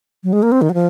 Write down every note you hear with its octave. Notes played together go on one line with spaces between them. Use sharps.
F#3
G#3
A#3
C4
D#3
F#3
F3